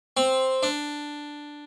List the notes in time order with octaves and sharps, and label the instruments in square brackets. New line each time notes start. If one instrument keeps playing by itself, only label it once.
[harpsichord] C4
D4